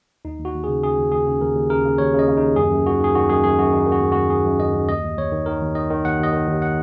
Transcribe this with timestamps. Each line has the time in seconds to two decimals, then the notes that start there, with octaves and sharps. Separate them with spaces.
0.25 D#2 D#4
0.39 D#2
0.45 F#4
0.55 D#2
0.64 C#3 G#4
0.83 C#3 G#4
0.97 D#2
1.12 D#2 G#4
1.27 C#3
1.41 D#2 A#4
1.55 D#2
1.70 C#3 A#4
1.85 C#3
1.98 D#2 C#5
2.14 C#3
2.19 D#5
2.27 C#3
2.37 D#2 D#4
2.56 F#2 G#4
2.72 F#2
2.86 D#3 F#4
3.00 D#3 G#4
3.14 D#3 F#4
3.30 F#2 G#4
3.44 F#2 G#4
3.58 F#2 F#4
3.72 D#3 D#4
3.87 D#3
3.92 F#4
4.02 F#2
4.12 F#2 F#4
4.30 F#2 G#4
4.45 F#2
4.60 F#2 D#5
4.74 F#2
4.89 D#2 D#5
5.04 D#2
5.18 D#2 C#5
5.32 D#3
5.46 D#3 A#4
5.62 D#2
5.75 D#3 D#5
5.91 D#3
6.05 D#2 F#5
6.19 D#2 D#5
6.33 D#3
6.48 D#2
6.62 F#5